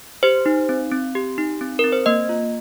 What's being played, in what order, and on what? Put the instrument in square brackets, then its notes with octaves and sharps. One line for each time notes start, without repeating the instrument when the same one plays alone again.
[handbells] G4 C5
D#4
C4
C4
G4
D#4
C4
C4 A#4
C5
A#3 D#5
F4